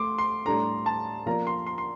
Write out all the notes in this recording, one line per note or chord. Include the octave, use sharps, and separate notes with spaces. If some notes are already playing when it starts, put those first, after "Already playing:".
Already playing: A3 C6 D6
C6
A2 G3 D4 A4 A#5
A5
F3 A#3 F4 A#4 D5 A#5
C6
C6
C6